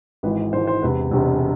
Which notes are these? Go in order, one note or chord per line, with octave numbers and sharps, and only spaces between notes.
G#1 G#2 E3 B4
G#1 G#2 E3 C5
C5
E1 E2 C3 B4
E1 E2 C3